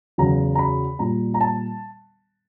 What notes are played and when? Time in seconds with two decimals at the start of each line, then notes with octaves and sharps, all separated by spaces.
0.18 E2 C#3 F#3 A#5
0.55 A#5
0.59 B5
0.99 A#2 G3 A#5
1.34 A#5
1.41 A5